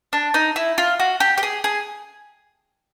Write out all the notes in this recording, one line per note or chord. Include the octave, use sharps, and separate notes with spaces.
D4
D#4
E4
F4
F#4
G4
G4
G#4
G#4